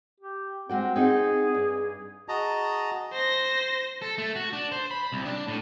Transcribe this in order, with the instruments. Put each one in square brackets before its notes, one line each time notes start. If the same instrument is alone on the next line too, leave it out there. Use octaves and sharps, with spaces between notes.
[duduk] G4
[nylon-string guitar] G#3 F#4 G5 [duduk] C4
[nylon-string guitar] C4 D#4 F#5 [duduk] G#4
[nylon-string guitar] G2
[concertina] F#4 G#4 D#5 A5 A#5
[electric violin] C5 A#6
[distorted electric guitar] A4
A3
F#4
D4
C5
B5
C2
D4
A2